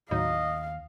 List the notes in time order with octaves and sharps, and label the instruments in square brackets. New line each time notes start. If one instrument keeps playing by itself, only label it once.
[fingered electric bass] D#2 [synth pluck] A2 F#3 D#4 [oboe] D#5 [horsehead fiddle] F5